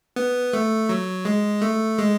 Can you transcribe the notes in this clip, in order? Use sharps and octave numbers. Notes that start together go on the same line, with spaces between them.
B3
A3
F#3
G#3
A3
G#3